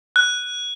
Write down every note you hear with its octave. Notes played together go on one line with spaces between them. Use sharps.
F#6